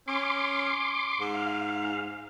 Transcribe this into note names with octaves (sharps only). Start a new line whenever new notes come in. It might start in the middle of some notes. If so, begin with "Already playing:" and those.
C#4 C6 D6
G#2
F5